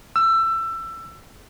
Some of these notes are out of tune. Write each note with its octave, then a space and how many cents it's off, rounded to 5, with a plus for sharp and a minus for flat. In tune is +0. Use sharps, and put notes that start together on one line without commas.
E6 +20